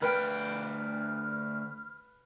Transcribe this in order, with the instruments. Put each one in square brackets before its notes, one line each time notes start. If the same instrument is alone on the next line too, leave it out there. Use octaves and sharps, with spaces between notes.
[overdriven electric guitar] D2 G5 [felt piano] B4 [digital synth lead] F6